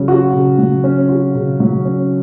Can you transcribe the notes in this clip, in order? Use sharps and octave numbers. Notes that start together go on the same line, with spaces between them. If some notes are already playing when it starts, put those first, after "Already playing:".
Already playing: C#3 F#3 C#4
F#4
C#3
F#3
C#4
F#4
C#3
F#3
C#4